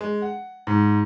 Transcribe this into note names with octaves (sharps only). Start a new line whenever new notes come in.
G#3
F#5
G#2